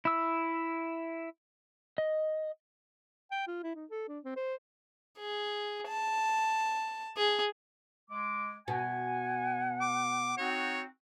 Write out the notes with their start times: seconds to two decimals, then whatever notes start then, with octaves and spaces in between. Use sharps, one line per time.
0.05 E4 E6
1.98 D#5
3.31 G5
3.47 F4
3.63 E4
3.76 D#4
3.90 A4
4.08 D4
4.25 C4
4.36 C5
5.19 G#4
5.88 A5
7.17 G#4
8.11 G#3 D6
8.68 B2 F#5 G#5
9.81 D6
10.38 C4 D#4 F#4 C#5